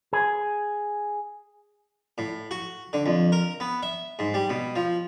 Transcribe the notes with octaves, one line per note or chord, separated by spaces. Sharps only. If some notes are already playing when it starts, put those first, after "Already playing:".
G#4
A2
F#4
D3
F2
A#4
B3
E5
G#2
G3
B2
F3